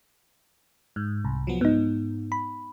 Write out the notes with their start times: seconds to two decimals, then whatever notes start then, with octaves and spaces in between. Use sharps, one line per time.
0.96 G#2
1.24 C2
1.47 F3 F#3 B3
1.61 G#2 B3 D#4
2.32 B5